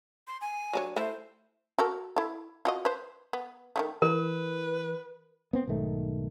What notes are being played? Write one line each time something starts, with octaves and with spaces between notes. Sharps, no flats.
C6
G#5
F#3 D4 C#5
A3 E4 C5
F#4 A4 A#4
E4 A4
F4 F#4 D#5
B4 C5
B3
D#3 G3 A3
E3 A#4 B4
B3 C4
B1 G#2 D#3 A3